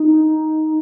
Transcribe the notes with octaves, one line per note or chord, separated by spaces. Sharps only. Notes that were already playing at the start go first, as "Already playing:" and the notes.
Already playing: D#4